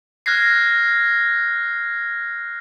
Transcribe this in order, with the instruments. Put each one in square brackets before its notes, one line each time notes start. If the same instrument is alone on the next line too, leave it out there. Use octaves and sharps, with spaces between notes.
[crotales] F6 F#6 G#6 A#6 C7